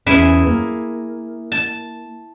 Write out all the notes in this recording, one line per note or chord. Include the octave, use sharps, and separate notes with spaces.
E2 C#4 E4 G#4 E5
A#3
A5